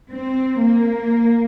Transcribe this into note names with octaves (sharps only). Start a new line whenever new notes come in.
C4
A#3